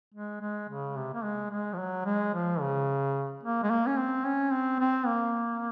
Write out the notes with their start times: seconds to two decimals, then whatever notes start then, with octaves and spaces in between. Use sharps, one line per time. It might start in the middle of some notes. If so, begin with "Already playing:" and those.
0.14 G#3
0.41 G#3
0.69 C#3
0.96 C3
1.14 A#3
1.24 G#3
1.51 G#3
1.73 F3
1.79 F#3
2.05 G#3
2.34 F3
2.61 C#3
3.43 A#3
3.63 G#3
3.70 A#3
3.87 C#4
3.98 C4
4.25 C#4
4.53 C4
4.79 C4
5.06 A#3